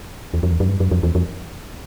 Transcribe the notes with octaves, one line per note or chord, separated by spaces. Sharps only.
E2
F2
E2
F#2
G2
F#2
F2
E2
F2